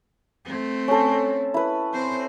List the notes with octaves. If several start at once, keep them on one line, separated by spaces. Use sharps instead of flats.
A3 C4
C#4 A4
E4 B4
C4 C5